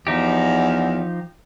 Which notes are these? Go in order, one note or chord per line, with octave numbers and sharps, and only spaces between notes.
E2 F3 D#4 G4